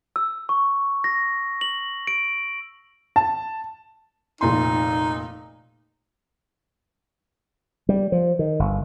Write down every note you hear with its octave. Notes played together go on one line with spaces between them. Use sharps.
E6
C#6
A#6
F#7
D7
A5
F1 A#2 D#4 C6
G3
F3
D#3
G1